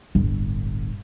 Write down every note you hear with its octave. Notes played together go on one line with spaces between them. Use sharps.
D1 G1